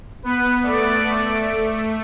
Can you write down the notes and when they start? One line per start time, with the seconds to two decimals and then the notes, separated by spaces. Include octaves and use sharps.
0.24 B3 B4
0.64 A3 D5
1.04 A3